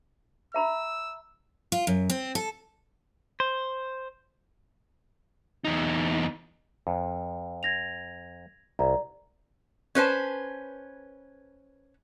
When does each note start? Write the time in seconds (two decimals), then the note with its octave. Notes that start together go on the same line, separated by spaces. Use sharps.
0.54 E5 A#5 B5 E6
1.72 F4
1.87 F#2
2.10 C4
2.35 A4
3.40 C5
5.65 E2 D#4
6.87 F2
7.63 G#6 A#6 F7
8.79 C2 D5 A#5
9.95 C#4 B4 C5 A5